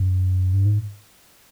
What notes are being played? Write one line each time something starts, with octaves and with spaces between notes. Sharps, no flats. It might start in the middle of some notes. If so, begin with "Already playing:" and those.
Already playing: F#2
G2
G#2